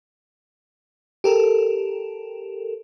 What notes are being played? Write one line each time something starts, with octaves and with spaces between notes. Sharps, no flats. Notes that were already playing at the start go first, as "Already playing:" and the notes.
G4 A4 A#4